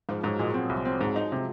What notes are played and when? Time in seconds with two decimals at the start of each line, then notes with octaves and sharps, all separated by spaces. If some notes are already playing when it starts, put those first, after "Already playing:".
0.09 G#2 F3
0.23 G#2 F#3
0.39 A#2 G#3
0.54 C4
0.69 C2
0.85 C4
1.01 G#2
1.16 D#4
1.32 C3